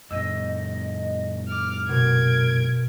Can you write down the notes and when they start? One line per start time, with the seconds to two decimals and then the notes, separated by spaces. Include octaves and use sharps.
0.10 F#2 A#2 D#5 E6 G6 D#7
1.48 D6 F6
1.89 B2 A#4 G#6 D7